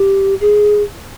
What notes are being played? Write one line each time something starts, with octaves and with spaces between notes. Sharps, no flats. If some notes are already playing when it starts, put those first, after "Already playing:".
Already playing: G4
G#4